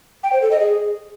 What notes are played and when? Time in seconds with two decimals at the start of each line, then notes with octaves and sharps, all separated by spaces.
0.23 G5
0.33 C5
0.42 A4
0.51 D#5
0.60 G#4